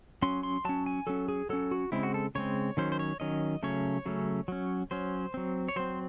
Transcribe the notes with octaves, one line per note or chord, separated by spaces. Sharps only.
F#3 C#4 C6
C6
F#3 C#4 A5
G#5
F#3 C#4 A4
G#4
F#3 C#4 A4
F#4
C#3 G#3 C4 E4
F#4
A4
C#3 G#3 C4 C#5
D#3 F#3 C#4 C5
C5
C#5
D#3 F#3 C#4 D#5
C#3 F#3 A3 C#4 C#5
C#3 F#3 A3 C#4
F#3 C#4
F#3 C#4 C5
F#3 C4
C#5
F#3 C4 C5